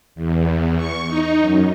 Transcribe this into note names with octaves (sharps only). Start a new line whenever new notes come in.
E2
C#6
D#4
F#2